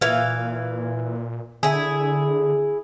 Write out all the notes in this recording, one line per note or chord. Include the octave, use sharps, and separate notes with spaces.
A#2 E3 F5
D3 E4 G#4